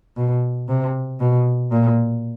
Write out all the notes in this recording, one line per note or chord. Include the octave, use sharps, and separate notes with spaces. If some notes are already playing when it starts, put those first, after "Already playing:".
B2
C3
B2
A#2